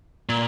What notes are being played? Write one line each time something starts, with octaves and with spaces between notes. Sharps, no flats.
A#2